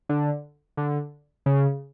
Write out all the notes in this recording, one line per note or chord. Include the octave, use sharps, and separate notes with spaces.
D3
D3
C#3